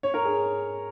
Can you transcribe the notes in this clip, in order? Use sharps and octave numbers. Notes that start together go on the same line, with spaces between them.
C#5
A#4
G#4